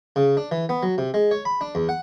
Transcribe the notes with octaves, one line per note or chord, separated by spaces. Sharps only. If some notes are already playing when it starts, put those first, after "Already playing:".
C#3
D4
E3
B3
F#3
C3
G#3
C#5
B5
D4
E2
F#5